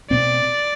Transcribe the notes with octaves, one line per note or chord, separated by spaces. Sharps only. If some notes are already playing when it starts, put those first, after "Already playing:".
B2 A3 C4 D5